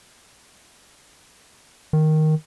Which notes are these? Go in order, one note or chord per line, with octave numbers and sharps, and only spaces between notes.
D#3